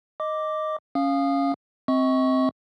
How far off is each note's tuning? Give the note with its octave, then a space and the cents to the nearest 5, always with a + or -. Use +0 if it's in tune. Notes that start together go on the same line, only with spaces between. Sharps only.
D#5 +0 D6 +0
C#4 +0 F5 +0 D#6 -20
C4 +0 D#5 +40 C#6 +0